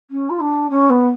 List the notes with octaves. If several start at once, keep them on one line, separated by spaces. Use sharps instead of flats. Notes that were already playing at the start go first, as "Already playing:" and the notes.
C#4
F4
D4
C#4
B3